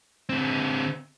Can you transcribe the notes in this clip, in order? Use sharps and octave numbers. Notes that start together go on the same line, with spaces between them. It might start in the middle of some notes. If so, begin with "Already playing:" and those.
D3 C4